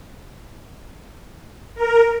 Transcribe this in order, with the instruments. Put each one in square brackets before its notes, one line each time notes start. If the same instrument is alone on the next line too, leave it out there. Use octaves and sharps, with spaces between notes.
[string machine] A#4